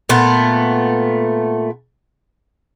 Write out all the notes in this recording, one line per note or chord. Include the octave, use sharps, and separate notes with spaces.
A#2 A3 B3